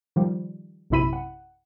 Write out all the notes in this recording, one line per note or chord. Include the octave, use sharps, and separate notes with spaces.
D#3 F3 G3
A#1 F#2 C3 E4 B5 D#7
F#5